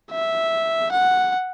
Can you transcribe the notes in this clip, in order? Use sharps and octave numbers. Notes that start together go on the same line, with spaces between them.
E5
F#5